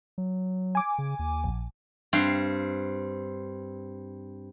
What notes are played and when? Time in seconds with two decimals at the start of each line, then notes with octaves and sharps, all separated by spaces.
0.18 F#3
0.75 G#5 D6
0.98 C#3
1.19 D#2
1.44 A#1
2.13 G2 C4 F5 C6